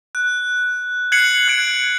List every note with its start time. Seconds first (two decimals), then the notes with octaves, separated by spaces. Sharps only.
0.15 F#6
1.12 F#6 G#6 C7 C#7 F#7
1.48 F#6 G#6 D7